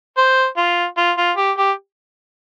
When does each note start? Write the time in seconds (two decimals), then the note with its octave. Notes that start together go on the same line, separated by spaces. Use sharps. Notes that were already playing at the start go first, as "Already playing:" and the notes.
0.17 C5
0.57 F4
0.97 F4
1.18 F4
1.37 G4
1.58 G4